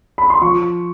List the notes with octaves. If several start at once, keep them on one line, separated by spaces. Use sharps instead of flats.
B5
C6
F3 C#6